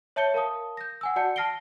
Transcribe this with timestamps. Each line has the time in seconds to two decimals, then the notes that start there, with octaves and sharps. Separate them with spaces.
0.16 C#5 E5 A5 G6 C#7 G7
0.34 A#4 F5 A5 D#6
0.77 G6 A#6
1.01 F#5 G#5 E6
1.16 F#4 D5 F#5 A5 G6 C#7
1.36 A5 F6 A#6 C7 D7 G7